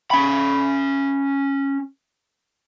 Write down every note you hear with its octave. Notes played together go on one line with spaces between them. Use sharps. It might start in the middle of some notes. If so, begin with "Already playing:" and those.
C#4 B5